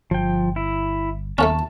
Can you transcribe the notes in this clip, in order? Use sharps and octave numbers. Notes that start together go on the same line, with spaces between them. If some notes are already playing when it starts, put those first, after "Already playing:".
G1 F3 G5
E4
D#2 A3 A#3 C#4 A5